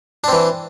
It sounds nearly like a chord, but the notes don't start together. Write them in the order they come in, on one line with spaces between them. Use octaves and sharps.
D4 C4 E3